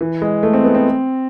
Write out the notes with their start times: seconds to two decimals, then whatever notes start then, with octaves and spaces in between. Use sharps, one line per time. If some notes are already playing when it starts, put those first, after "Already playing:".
0.01 E3
0.22 G#3
0.43 A3
0.54 C4
0.64 B3
0.75 C4